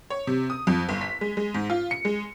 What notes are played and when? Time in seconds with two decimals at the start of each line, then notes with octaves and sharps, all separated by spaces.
0.10 C#5
0.27 C3
0.50 D#6
0.67 F2
0.89 G1
1.01 B6
1.21 G#3
1.37 G#3
1.54 G#2
1.70 F4
1.91 C#7
2.05 G#3